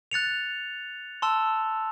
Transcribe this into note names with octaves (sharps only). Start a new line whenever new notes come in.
F#6 A6 C#7 F7
A5 C6 E6